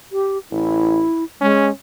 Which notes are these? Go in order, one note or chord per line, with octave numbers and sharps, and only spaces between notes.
G4
A1 E4
G#3 C#4